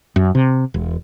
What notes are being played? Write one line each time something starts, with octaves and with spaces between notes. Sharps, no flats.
F#2
C3
E1